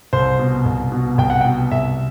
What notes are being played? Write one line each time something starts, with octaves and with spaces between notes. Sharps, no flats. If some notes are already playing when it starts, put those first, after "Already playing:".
C2 C5
B2
C2
B2
C2 G5
F#5
B2 G5
C2 E5